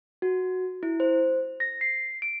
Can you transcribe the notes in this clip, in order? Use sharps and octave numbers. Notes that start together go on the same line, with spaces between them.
F#4
E4
C5
A#6
C7
D7